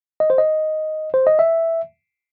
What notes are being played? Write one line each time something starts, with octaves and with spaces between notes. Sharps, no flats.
D#5
C5
D#5
C5
D#5
E5